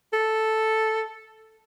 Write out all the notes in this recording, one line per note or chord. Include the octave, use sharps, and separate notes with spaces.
A4